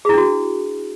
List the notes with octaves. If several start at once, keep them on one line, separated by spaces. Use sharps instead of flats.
D4 E4 F#4 G#4